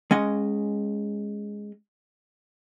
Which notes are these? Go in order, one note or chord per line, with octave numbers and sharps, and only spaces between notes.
G#3 C#4 D#5